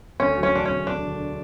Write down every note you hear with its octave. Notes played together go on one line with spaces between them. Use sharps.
D2 C#4
F#3
C#4
E1 D4
D2 C#4
D2 D4
D3